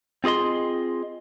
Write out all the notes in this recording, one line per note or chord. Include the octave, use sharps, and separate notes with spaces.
C4 F4 G#4 D#5 C6